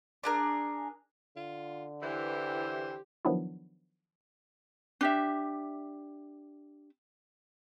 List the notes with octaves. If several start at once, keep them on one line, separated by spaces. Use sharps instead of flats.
D4 G#4 A#4
D3 F4
E3 G4 C5
D#3 F3 F#3 B3 D4 E4
D4 G4 E5